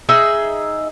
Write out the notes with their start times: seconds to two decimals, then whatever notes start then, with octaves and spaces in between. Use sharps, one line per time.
0.09 D#4 G#4 D#5 E5